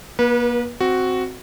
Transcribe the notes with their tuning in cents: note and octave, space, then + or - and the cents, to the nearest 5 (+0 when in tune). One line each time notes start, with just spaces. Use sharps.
A#3 +40 B4 -30
C4 +0 F#4 +0